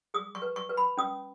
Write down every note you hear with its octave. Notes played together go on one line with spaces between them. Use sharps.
G#4 D#6
C#6
B4
C#6
B4
B5
C#4 D#6